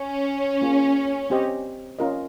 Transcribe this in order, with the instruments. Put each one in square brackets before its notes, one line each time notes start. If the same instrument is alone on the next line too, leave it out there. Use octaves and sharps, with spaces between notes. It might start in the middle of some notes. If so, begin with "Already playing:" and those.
Already playing: [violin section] C#4
[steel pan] A#3 F4 G#4
C4 G4 C5 D#5
C#4 F4 A#4 D#5